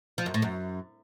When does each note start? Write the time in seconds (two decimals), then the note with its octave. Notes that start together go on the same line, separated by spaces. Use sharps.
0.18 F3
0.26 F#2
0.34 A2
0.42 F#2